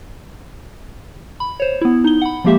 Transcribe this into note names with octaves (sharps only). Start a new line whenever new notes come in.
B5
C5 C#5
B3 E4
D#4 G7
F#5 B5
F3 G#3 A#3 G4 E5